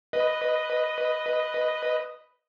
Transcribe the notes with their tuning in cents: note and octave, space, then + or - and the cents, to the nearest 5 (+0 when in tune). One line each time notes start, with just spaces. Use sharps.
B4 +0 D#5 +0